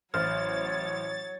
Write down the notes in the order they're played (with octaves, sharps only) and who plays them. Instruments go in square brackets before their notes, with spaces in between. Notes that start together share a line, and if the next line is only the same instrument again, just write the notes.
[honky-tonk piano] A1 C5 [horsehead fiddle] F#3 C#5 [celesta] F6 [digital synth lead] A6